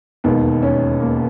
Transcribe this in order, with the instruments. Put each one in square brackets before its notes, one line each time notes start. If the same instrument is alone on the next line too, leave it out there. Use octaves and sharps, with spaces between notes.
[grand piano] E1 D#2 D#3 G#3 B3
C#4
A#3